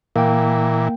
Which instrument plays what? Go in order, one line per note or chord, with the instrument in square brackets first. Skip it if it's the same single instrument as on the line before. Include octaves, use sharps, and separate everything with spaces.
[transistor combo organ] A#2 E3 [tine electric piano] A#3 G5